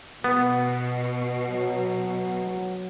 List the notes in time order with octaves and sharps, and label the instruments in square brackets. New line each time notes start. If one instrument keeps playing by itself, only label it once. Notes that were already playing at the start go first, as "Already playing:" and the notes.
[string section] B2 [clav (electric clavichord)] B3
[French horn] F#3